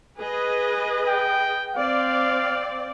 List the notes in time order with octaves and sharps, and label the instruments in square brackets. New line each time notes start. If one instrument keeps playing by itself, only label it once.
[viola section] G#4 B4 D#5
[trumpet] G5
[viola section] C4 D5 [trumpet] F5